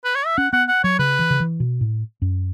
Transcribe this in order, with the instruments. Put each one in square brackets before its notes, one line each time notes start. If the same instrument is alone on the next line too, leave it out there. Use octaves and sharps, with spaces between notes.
[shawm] B4
C#5
E5
[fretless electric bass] C#4 [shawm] F#5
[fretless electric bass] B3 [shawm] F#5
[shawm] F#5
[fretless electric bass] F#3 [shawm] C#5
[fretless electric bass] C#3 [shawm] B4
[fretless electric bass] E3
C#3
E3
B2
A2
F#2